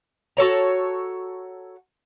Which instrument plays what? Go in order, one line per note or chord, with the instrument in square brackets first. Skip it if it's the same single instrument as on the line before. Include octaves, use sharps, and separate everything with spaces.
[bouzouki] F#4 A4 C#5 A#5